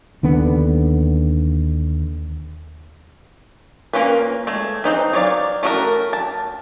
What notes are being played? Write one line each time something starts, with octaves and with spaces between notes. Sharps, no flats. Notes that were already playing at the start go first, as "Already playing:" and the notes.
D#2 D3 B3
A#3 B3 C#4 F4 B4
G#3 A3
C4 C#4 D#4 B4
F#3 C#5 D5 F5
A3 C#4 F#4 A4 A#4
A5